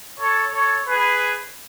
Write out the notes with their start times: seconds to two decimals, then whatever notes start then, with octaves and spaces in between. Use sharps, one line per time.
0.19 A4 C#5
0.52 A4 C#5
0.86 G#4 B4